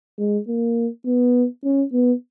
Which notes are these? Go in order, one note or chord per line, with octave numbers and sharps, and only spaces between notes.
G#3
A#3
B3
C#4
B3